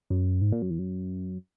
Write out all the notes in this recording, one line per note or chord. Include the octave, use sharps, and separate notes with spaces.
F#2
G#2
A#2
F#2
E2
F#2